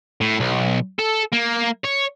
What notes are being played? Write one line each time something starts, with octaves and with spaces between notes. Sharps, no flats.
A2
B1
A4
A#3
C#5